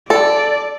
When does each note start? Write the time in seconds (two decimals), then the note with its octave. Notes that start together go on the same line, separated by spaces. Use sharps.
0.10 A4 D5